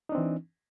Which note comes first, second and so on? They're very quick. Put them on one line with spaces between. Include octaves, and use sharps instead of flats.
D#4 D4 C4 E3